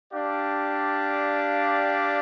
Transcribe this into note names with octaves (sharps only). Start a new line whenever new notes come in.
D4 G4 D5 F5